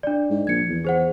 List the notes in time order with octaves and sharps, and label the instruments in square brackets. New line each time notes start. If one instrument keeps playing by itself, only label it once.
[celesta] D4 D5
[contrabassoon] G#2
[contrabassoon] A#1 [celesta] G#6 C#7
[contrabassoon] E2
[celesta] G#4 C5 F#5